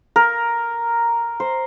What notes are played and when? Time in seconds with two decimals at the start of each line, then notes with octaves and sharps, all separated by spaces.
0.16 A#4
1.40 C5